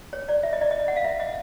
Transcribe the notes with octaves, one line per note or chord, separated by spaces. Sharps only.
C#5
D5
E5
D#5
D5
D#5
F#5
F5
E5
D#5